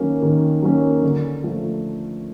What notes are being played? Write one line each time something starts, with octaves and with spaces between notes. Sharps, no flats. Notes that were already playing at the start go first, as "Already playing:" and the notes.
Already playing: D#3 F#3 A#3 C#4
D#3
F#3 A#3 C#4
D3
F3 A3